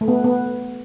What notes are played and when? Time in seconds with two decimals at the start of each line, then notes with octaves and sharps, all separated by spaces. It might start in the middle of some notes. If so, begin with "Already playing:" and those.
0.01 A3
0.08 B3
0.24 B3